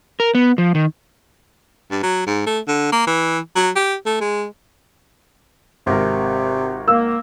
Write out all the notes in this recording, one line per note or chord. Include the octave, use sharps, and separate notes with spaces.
A#4
B3
F3
D#3
G2
F#3
G#2
A3
D3
A#3
E3
F#3
G4
A3
G#3
G#1 C3 A#4
A#3 E6